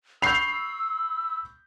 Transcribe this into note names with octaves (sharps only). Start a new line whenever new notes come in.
B5 C#6 E6 G6 C7 F7